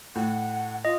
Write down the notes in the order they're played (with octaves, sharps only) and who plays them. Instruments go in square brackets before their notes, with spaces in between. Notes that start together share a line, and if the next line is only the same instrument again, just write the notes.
[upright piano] A2 [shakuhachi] F#5
[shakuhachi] F4 [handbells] D#5